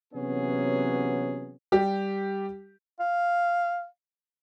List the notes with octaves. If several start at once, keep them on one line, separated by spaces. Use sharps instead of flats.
C3 E3 F#3 B3 C#4 G#4
G3 G4
F5